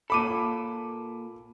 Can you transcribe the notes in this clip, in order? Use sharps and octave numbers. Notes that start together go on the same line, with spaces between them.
A#2 A4 B5 D6 D#7